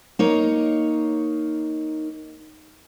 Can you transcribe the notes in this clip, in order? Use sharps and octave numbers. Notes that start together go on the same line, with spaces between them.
A#3 D#4 C#5